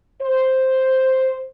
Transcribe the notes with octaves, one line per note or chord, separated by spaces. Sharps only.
C5